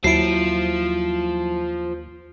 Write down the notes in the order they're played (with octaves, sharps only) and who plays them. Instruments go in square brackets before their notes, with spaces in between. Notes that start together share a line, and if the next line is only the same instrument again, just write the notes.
[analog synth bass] D#2 [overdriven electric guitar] F3 [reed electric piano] F#3 E4 [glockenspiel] C7 D7